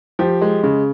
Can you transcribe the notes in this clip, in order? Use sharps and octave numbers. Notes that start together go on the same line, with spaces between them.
F3 G4
G#3
C#3